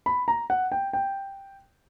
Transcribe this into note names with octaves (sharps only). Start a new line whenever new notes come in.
B5
A#5
F#5
G5
G5